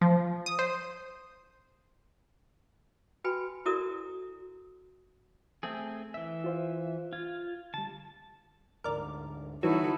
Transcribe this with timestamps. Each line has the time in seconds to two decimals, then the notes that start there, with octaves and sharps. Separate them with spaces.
0.01 F3
0.46 D#6
0.59 C5
3.24 F#4 B4 G5 G#5 B5
3.66 E4 F#4 A4 A#4 D5 D#6
5.63 A3 C4 G#4
6.14 E3 E5
6.44 F4 C5 F5
7.13 F4 G#6
7.74 D3 G3 A5
8.84 D2 G#2 D3 A#4 D5
9.63 D3 E3 F#3 G3 D#4 E4 F#4 A4